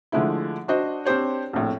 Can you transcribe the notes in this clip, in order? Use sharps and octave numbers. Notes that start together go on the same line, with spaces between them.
D3 F3 G#3 A3 E4
D4 F#4 C5 D#5
C4 D4 G4 C5 C#5
A#1 F2 A2